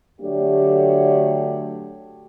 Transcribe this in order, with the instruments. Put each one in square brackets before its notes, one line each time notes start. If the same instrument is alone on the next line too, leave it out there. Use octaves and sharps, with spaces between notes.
[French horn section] D3 F#3 A3 D4 G4